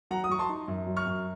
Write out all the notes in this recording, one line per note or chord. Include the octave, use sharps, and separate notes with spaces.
F#3 F#5 A#5
D#6
F#3 C#6
A5 C6
D#4
F#2
F#3
C#6 F6
F#2